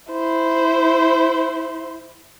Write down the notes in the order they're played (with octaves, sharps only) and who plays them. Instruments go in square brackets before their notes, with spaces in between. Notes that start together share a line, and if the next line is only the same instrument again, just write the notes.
[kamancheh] E4 C5